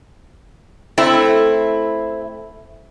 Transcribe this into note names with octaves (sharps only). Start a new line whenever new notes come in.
A3 C4 E4